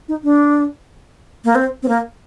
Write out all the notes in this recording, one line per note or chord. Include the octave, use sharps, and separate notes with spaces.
D#4
D4
A#3
C4
C4
A#3